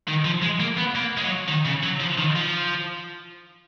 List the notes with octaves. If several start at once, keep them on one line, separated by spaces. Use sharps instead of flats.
D#3
F3
G#3
A#3
B3
A#3
G#3
F#3
D#3
C#3
F#3
F3
D#3
F3